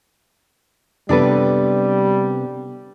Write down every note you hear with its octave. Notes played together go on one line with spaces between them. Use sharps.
C3 G3 B3 C4 D4 A4 B4